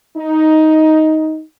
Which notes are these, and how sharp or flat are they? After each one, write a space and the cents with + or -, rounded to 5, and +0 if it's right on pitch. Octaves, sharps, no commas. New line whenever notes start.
D#4 +10